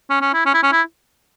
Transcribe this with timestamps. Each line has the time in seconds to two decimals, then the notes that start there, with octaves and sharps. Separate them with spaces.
0.10 C#4
0.21 C#4
0.34 E4
0.46 C#4
0.54 E4
0.63 C#4
0.72 E4